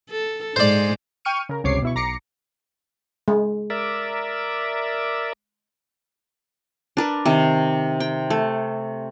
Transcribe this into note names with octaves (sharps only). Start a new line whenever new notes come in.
A4
G#2 G#3 C5 D5
G5 C#6 F6 C#7 D#7
C#3 A#4
G1 C#2 C3 C#5 D6 C7
B2 E4 C#6
B1 A#5 D6 A#6 C7 C#7
G#3
A#4 D5 E5
D4 A#4 B4
C3 D#3
G5
A3